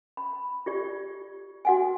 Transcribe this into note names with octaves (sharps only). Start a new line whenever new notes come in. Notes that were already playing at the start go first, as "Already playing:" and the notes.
B5
F4 G4 D5
F#4 F#5 G#5